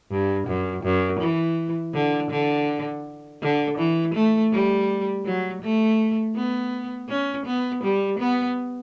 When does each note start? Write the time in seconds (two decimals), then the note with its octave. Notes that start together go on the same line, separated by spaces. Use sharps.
0.11 G2
0.47 F#2
0.84 F#2
1.20 E3
1.94 D3
2.31 D3
3.42 D3
3.78 E3
4.14 A3
4.52 G3
5.25 F#3
5.62 A3
6.36 B3
7.09 C#4
7.46 B3
7.84 G3
8.19 B3